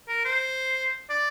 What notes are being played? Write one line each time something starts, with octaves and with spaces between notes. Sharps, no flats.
A#4
C5
D5